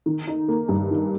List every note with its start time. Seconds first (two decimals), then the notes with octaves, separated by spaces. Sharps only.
0.06 D#3
0.27 D#4
0.48 A#3
0.69 G2
0.91 D#3